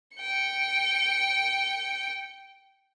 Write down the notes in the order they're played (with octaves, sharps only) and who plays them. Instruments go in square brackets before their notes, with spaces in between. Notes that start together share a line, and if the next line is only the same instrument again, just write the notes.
[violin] G5 C#7